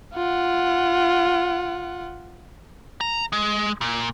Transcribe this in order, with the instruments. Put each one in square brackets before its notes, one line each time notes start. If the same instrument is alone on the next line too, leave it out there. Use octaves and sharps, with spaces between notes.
[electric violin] F4 F#5
[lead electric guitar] A#5
G#3
A#2